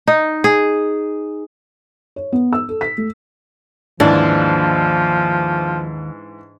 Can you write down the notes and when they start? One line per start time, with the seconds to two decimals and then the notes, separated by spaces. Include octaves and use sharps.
0.07 D#4
0.44 G#4
2.16 C#5
2.32 B3
2.53 E6
2.69 A4
2.81 B6
2.98 A3
4.00 D#2 G#2 E3 F3 D4